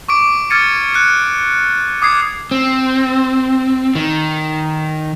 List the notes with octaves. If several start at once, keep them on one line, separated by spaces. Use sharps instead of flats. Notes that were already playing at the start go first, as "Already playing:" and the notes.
C#6 D6 D7
D6 F6 G#6 A6 C#7 D#7
F#6 C#7
D6 D#6 G#6 C7
C4
D#3